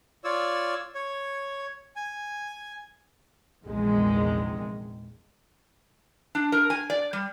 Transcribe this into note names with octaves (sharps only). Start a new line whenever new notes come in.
F4 C#5 D5 E6
C#5
G#5
A#1 E2 C3 D#3 G#3
D4
A#4
G#5
D5
G3